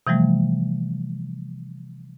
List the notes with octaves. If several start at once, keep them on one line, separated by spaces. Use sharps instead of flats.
C3 E3 F3 G3 A3